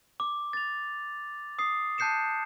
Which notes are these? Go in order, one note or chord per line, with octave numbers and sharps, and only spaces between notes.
D6
A6 F7
D#6 C7
A5 F#6 G6 C7 C#7 E7